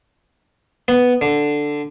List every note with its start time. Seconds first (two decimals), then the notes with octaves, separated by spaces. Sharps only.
0.88 B3
1.21 D3